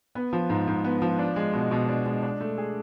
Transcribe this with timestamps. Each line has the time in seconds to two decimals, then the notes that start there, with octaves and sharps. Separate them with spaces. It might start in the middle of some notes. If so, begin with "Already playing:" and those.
0.15 B3
0.33 F3
0.50 G#2
0.68 G#2
0.84 B3
1.02 F3
1.19 D4
1.36 G#3
1.53 B2
1.71 B2
1.88 D4
2.06 G#3
2.23 D4
2.40 A3
2.58 G#4